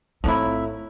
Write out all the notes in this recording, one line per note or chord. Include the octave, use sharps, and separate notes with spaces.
A2 F3 F#3 C4 D#4 E4